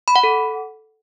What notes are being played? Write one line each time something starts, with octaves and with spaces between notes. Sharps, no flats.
B5
F#5
A4